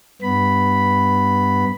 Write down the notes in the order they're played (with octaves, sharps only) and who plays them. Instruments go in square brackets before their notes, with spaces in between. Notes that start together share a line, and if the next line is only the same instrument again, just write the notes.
[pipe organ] G2 B3 B5